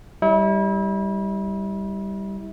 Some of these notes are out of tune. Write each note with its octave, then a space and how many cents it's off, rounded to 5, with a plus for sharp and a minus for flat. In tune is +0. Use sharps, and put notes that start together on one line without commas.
G3 +0 E4 -35